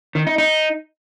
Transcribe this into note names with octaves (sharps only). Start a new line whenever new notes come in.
D#3
D#4
D#4